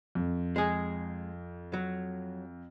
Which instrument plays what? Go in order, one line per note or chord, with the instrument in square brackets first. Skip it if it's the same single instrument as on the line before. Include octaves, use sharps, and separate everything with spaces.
[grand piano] F2
[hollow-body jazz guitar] G#3 G#4
F#3